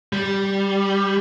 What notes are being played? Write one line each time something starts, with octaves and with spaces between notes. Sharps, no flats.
G3